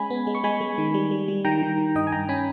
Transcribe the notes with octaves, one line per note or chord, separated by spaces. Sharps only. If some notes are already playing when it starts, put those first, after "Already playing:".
Already playing: G#3 C#4 G#5 B5
B3
G#3
C#6
G#3 G#5 B5
G#3
D#3
G3
G3
G3
D#3 G5 A#5
D#3
D#3
G2 D#5 G5
G#5
G2 G5 A#5
C#4 G#5 B5